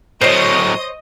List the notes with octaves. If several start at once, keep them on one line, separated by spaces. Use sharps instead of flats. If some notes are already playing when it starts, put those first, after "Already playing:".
A2 F#3 C5 C#5 D#5 D#6